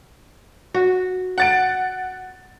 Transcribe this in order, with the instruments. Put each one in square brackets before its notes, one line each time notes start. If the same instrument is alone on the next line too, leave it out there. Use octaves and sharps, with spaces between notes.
[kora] F#4
[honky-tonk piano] F#5 A6 D7